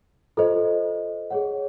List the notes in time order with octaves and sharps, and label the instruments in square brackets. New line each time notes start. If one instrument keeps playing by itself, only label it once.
[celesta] F4 A4 C5 D#5
G#4 C#5 F#5